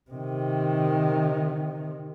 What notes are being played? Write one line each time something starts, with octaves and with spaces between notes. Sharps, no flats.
C3 D#3